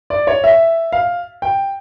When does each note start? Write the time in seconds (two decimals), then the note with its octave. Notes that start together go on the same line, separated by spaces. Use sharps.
0.10 D5
0.27 C#5
0.44 E5
0.92 F5
1.42 G5